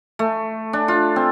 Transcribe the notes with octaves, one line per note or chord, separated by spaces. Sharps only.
A3
D4
F4
C4